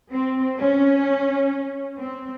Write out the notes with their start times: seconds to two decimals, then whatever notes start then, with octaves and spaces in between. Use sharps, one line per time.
0.12 C4
0.58 C#4
1.97 C4